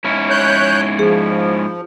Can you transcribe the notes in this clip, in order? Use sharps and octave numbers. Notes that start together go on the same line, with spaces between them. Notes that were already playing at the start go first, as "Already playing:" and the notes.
G#2 C#4 E4
C#5 F#6 G6
F3 G#4